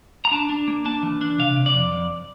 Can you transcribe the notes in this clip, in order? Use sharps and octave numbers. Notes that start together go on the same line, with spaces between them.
A#5
D4 A5
D4
A#3
D4 A5
E3
D4
C3 F5
C3
D5
F2
F2